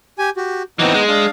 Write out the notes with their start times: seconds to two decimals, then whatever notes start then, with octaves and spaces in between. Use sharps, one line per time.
0.19 G4 G#5
0.37 F#4 G4
0.79 E3 B3 C4 D#4 D#5
0.94 G#3
1.08 D4 F5